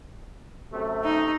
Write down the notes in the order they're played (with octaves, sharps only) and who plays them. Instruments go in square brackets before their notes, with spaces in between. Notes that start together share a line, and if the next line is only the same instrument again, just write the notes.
[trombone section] F#2 C3 A3
[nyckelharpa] D#4